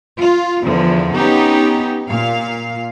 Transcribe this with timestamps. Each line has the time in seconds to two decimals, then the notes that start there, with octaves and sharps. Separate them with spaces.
0.18 F4
0.63 E2 D3 F3
1.15 B3 C#4 D#4 G4
2.08 A#2 F5